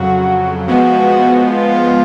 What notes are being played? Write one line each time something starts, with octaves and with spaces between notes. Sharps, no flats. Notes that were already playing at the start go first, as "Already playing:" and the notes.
Already playing: F2 C#3 F#3 F#4
F3 G#3 B3 F#4
F4